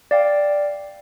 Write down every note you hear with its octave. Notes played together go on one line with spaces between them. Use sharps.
D5 F5 G5